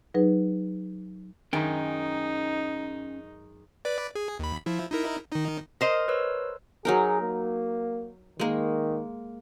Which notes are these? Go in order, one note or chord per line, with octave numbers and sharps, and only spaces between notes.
F#3 D#4 G#4 B4
F#2 D#3 G#3 C#4 D#4 G5 G#5
B4 D5
G#4
D#2 B5
F3 E4
D#4 E4 A#4
D#3 D#4
A#4 C5 D#5
B4 C#5 E6
F#3 D#4 G#4 A#4
A#3
D#3 G#3 A#3